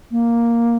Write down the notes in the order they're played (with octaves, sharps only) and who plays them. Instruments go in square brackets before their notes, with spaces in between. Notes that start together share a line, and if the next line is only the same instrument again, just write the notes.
[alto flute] A#3